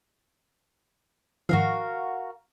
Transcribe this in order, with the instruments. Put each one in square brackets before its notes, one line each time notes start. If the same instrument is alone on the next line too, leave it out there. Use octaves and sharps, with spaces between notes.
[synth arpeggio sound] G#2 D#3 F3 [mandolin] F#4 A#4 F5